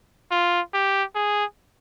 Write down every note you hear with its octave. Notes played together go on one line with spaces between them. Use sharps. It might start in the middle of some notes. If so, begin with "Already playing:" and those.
F4
G4
G#4